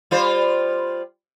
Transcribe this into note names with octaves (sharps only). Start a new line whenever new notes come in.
G3 F4 C5